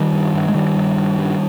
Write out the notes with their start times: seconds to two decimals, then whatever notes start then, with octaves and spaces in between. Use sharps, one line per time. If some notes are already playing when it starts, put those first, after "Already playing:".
Already playing: D#3 G3
0.13 G2
0.34 G2
0.48 G#3
0.55 G2 D#3 G3
0.77 G2
0.97 G2
1.18 G2